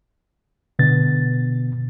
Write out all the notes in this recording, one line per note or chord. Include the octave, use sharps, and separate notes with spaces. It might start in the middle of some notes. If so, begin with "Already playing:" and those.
B2 D3 B3 A6